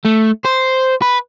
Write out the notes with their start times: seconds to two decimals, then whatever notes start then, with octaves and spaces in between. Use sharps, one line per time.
0.05 A3
0.45 C5
1.02 B4